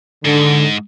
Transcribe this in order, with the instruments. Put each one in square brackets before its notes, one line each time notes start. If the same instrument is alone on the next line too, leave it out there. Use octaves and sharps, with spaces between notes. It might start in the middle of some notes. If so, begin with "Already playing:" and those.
[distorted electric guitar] G#2 [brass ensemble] D3